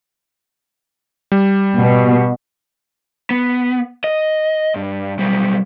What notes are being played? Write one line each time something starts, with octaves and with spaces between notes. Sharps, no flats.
G3
B2
B3
D#5
G2
B1 G3